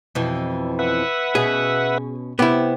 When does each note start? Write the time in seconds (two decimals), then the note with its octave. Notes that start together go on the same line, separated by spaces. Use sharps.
0.15 F2 B2 E3
0.79 B4 E5 F#5
1.35 B2 C#4 G#4
2.39 C3 B3 E4 G4